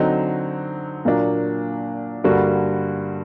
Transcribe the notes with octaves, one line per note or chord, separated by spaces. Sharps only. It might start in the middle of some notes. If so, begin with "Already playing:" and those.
Already playing: D3 F#3 C4 D#4
A#2 F#3 A#3 D4
G2 D3 G3 A#3 F#4